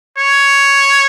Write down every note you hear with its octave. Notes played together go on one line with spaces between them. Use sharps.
C#5